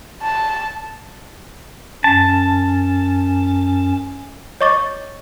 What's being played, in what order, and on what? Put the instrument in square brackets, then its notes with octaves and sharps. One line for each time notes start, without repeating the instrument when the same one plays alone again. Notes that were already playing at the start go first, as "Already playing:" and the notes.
[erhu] A5
[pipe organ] F#2 C#4 [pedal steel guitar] A5
[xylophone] C#5 D#5 C#6 D6 A6